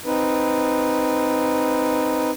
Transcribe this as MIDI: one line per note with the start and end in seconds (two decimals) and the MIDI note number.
0.05 2.31 60
0.05 2.31 63
0.05 2.31 71